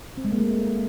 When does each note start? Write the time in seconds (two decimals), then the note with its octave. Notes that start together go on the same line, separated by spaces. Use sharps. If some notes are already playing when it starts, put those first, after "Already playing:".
0.17 C4
0.25 G#3
0.32 A#3
0.39 A3